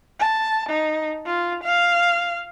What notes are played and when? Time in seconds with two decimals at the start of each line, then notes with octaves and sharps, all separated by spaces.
0.19 A5
0.69 D#4
1.26 F4
1.64 F5